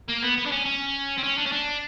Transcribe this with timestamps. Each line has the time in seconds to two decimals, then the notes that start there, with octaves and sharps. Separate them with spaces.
0.08 A#3
0.22 B3
0.37 B3
0.46 D4
0.51 C#4
0.66 C#4
1.18 C4
1.24 C#4
1.38 D4
1.46 C#4
1.53 D4